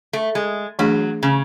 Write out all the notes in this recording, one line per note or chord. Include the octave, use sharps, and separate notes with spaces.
A3
G#3
E3 F#3 A3 D4 G#4
C#3